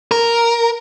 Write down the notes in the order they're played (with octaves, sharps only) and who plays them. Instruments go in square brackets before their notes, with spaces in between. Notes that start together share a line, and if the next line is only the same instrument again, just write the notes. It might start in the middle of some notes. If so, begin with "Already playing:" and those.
[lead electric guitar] A#4